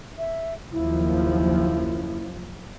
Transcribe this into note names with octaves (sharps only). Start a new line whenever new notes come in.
E5
F#1 D#2 F3 E4